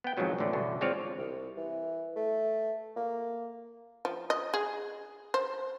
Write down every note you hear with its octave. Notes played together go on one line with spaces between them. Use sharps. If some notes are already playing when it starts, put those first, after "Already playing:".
B3 G5
F2 G#2 D#3 F3 F#3 B3
A1 D2 D3 D5
E2 G2 B2 D3
G#3 C4 F4 C#5 D5 F5
C2
E3
A3
A#3
F3
D#5
G#4
C5